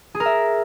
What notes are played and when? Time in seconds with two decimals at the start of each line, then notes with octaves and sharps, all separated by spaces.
0.15 G#4
0.20 A#4
0.26 E5